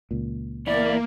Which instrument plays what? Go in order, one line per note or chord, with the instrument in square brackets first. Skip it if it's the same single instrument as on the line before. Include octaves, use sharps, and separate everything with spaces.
[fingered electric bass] C#2 A#2
[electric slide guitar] E2 B3 E4 [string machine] A#3 [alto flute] D5